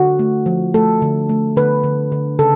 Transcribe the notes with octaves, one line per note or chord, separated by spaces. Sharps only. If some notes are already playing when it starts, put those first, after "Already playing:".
Already playing: D3 F#4
A3
F3
A3 A4
D3
A3
D3 B4
D3
D3
C#3 A4